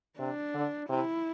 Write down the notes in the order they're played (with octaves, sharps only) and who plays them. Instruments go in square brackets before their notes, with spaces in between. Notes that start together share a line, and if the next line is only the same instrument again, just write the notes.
[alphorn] C3 [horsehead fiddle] D4
[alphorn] D3
[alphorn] C3 [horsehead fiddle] E4